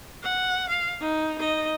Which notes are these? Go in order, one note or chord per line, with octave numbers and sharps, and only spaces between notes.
F#5
F5
D#4
D#4 D#5